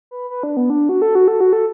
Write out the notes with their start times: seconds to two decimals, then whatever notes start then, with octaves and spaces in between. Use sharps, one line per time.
0.11 B4
0.30 B4
0.43 D4
0.57 B3
0.70 D4
0.89 F#4
1.02 A4
1.15 F#4
1.28 A4
1.40 F#4
1.53 A4